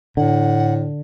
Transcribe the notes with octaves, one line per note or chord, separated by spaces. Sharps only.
A2 D3 F#5